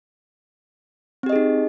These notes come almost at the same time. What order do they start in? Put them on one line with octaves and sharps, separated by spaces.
C4 G4 D#5 G#4 D#4